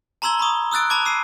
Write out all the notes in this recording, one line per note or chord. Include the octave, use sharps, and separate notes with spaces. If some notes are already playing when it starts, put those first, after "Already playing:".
A5 A#5 C6 E6 G#6 G7
B5 C#6 D#6
D#6 E6 F#6 A6 D7
A5 B5 D6 G#6
E6 C7 D#7